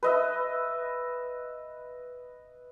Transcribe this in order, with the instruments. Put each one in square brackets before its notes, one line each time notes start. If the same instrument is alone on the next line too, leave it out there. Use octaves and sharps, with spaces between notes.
[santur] B4 D#5 E5